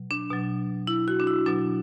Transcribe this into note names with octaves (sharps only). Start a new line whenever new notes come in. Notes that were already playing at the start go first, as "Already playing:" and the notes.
Already playing: B2 F#3
D4
B2 F#3
E4
F#4
D4
E4
B2 F#3 D4